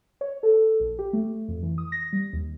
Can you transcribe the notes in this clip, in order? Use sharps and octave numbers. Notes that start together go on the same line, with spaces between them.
C#5
A4
A#1
G4
A3
F2
E3
D#6
A#6
G3
D#2